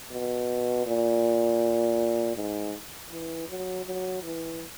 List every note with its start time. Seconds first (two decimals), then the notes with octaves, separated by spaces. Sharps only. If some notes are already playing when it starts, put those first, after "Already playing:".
0.11 B2
0.86 A#2
2.36 G#2
3.11 E3
3.49 F#3
3.86 F#3
4.23 E3